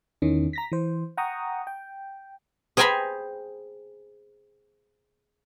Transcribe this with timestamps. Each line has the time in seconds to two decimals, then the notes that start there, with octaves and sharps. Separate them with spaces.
0.22 E2 D#3 E3 C#4
0.53 A#5 A#6 B6
0.72 E3 C5
1.17 F#5 G5 A#5 C#6 D#6
1.67 G5
2.77 G#4 C5 G5 G#5 A#5 B5